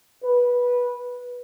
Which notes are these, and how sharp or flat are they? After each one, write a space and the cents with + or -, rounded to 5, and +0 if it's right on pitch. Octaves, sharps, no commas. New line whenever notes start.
B4 -15